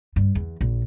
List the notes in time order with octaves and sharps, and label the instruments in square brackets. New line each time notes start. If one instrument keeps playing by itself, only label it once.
[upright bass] G2
E2
A#1